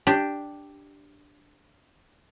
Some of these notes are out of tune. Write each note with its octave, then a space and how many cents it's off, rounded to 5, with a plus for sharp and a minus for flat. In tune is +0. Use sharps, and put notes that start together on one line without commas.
D4 +0 G4 +0